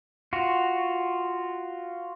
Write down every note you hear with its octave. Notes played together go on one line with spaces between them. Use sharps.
F4 F#4